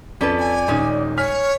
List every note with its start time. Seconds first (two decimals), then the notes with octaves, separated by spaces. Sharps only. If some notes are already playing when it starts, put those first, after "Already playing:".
0.21 F2 C#4 A4 B4 D5
0.39 G#5
0.68 D#1 G#3 C#4 D#4
1.18 C#5 G#5 F6 B6